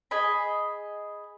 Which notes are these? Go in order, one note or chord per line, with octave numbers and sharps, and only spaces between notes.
G#4 D#5 B5